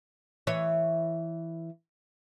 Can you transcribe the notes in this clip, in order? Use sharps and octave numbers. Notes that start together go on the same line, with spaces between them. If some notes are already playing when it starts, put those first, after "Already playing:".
E3 C#5